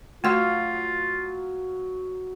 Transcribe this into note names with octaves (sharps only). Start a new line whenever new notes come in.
F#3 A3 F4 F5 F#5 C6